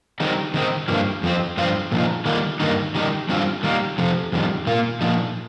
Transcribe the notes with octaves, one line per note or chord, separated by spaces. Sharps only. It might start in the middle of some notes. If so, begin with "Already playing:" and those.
D#3 G3 C4 D#4
D#3 C4 D#4
G2 F3 A#3
F2 F3 C4
G2 F3 C4 F4
A#2 F3 D#4
D#3 G3 A#3 F4
G2 D#3 A#3 D#4
D#3 G3 D#4
G2 G3 C4 F4
D#3 G3 A#3
F2 C3 F3
F2 D#3 G3
A#2 A#3 F4
A#2 F3 D#4